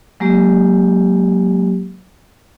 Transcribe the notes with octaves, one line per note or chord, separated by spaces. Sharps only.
F#3 G#3 A#3 G4